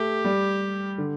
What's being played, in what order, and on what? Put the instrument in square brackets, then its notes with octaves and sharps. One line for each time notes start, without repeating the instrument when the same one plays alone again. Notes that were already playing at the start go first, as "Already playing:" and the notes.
Already playing: [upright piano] A3 [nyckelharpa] G4
[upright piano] G3
D3